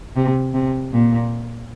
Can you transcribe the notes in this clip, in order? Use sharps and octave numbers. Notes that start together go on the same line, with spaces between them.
C3
C3
A#2